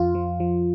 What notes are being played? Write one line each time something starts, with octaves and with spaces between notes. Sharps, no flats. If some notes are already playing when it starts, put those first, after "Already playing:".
Already playing: F2 F4
F3
F3